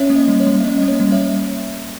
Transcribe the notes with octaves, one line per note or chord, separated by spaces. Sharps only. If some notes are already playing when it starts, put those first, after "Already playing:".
Already playing: C#4 C#5 E5
A#3
D#5
G3
C#5
G3
E5
C#4 D#5
A#3 D#5
C#5
G3
C#5 E5